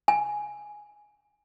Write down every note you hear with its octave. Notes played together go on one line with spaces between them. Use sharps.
G#5